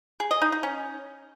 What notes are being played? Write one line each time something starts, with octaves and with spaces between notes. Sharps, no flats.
G#4
D#5
D#4
D#4
C#4